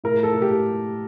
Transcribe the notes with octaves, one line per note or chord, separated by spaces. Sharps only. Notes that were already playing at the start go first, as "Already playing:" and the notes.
A2 A#4
A4
A2
G4